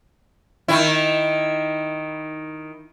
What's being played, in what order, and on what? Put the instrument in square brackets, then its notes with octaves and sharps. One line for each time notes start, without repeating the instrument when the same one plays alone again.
[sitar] D#3 E4